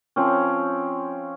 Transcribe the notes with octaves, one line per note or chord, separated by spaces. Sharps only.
F3 C4 C#4